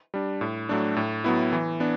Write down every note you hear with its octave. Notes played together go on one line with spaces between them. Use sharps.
G3 D4
A2
F#3 A3 D4
A2
F#3 B3 E4
E3
B3 D4